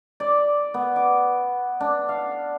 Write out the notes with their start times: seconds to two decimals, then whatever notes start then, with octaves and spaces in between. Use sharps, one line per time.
0.20 D5
0.74 B3
0.96 D6
1.80 D4
2.09 F5